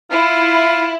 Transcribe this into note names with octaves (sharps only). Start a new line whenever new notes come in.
E4 F4